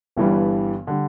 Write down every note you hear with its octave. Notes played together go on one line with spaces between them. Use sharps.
G1 G2 E3 G3
D3 G3